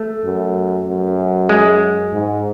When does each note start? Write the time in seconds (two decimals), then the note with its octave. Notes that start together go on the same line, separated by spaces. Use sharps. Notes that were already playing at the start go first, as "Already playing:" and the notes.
Already playing: A3
0.24 F#2
0.87 F#2
1.49 G#3
2.13 G#2